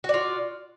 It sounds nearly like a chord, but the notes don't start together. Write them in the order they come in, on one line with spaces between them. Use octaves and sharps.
F#4 D5 F4